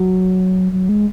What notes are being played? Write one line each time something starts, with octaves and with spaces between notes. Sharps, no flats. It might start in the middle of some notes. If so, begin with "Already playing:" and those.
Already playing: F#3
F#3
G#3